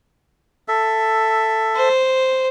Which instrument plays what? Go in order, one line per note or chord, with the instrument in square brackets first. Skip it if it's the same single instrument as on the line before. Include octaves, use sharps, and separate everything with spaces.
[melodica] A4 E5
[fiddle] C5